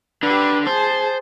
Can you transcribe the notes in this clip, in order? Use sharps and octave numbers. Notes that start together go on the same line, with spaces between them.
D3 D4 G4 B4
G#4 C5 A5